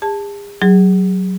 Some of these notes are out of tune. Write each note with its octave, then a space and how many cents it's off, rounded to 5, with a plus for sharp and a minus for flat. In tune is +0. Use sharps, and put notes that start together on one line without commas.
G#4 -45 A5 -5
F#3 +15 G#4 -30